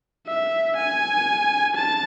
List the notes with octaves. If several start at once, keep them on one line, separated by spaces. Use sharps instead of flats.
E5
G#5
A5